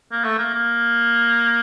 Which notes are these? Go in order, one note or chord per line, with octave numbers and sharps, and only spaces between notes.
A#3
A3
A#3
A#3